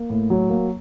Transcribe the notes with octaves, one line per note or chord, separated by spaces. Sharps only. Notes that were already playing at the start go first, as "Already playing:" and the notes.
Already playing: A#3
A2
F#3
A#3